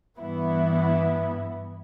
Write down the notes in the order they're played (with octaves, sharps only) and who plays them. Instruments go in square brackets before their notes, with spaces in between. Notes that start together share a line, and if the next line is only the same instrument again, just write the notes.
[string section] G2 E3 B3 E4